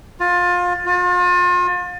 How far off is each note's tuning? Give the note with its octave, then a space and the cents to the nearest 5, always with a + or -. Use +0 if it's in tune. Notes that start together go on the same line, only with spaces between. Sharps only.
F4 +25
F4 +40